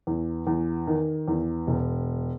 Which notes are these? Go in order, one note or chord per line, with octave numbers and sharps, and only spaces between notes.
E2
E2
D#3
E2
E1